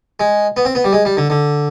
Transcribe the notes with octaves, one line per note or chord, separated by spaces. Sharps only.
G#3
B3
C4
B3
G3
G#3
G3
D3
D3